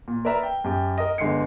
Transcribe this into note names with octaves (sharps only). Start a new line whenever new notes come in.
A#2
A#4 B4 D5 E5 A#5
G5
F#2 G4 G5
A#4 D#5
G1 D3 G#3 C7 C#7